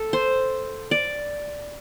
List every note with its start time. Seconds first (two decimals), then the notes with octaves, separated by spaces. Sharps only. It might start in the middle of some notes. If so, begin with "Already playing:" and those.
Already playing: A4
0.13 C5
0.91 D5